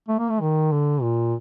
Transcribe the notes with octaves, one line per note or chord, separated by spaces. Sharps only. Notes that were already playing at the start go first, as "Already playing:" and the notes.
A3
A#3
A3
D#3
D3
A#2